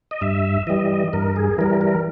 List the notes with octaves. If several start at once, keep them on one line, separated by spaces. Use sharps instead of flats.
D#5
G2 E5
E3 G3 D#5
G2 A#4
G#4
E3 G3 A#4
A#4